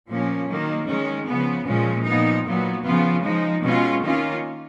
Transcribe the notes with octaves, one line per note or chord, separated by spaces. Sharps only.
A#2 F3 A#3 C#4
D#3 F#3 A#3
D#3 G#3 C#4
C#3 F3 B3
A#2 F3 G#3 C#4
A#2 F3 B3 D#4
A#2 F#3 B3
C#3 F3 B3 F4
F3 G#3 D#4
B2 G#3 C#4 F4
D#3 A#3 C#4 F4